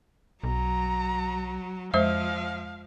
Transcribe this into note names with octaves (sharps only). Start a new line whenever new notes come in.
B1 F#3 A#5
F2 F3 G#3 C5 E5 F5